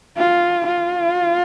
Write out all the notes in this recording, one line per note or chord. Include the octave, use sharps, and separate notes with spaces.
F4
F4